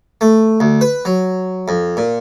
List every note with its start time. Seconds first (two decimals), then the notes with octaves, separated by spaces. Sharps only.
0.21 A3
0.60 D2
0.81 B4
1.05 F#3
1.68 F2
1.97 A#2